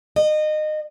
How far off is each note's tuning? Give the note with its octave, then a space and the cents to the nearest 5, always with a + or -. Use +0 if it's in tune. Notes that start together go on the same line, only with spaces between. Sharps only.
D#5 -25